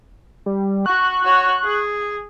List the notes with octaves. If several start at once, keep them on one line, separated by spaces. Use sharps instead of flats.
G3
F#4 C#6 F#6
F#4 C#5
G#4